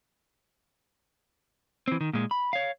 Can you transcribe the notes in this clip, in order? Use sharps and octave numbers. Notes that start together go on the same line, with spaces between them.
E3 C4
D#3
A#2 G#3
B5
C#5 F5